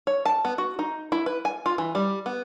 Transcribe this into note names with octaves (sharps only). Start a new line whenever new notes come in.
C#5
A5
B3
F#4
D#4
E4
B4
G#5
F4
E3
G3
B3